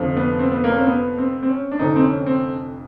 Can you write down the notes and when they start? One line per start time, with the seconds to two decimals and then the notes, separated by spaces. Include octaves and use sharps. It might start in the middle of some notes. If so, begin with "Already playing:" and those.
Already playing: F1 F2 D3 F3
0.17 B3
0.39 C4
0.52 B3
0.64 A#3
0.71 C#4
0.78 C4
0.87 B3
1.18 C4
1.43 C4
1.49 C#4
1.72 D4
1.79 F1 F2 D3 D#4
1.96 C4
2.04 C#4
2.26 C4